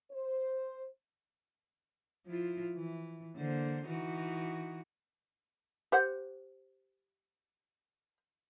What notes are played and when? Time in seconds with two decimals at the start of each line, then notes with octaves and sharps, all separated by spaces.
0.11 C5
2.26 F3 E4 F4
2.74 E3
3.36 D3 A#3 C5
3.86 E3 D#4 F#4
5.92 G4 C5 F#5